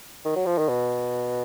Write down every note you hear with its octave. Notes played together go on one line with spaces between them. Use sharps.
D#3
F#3
F3
D#3
B2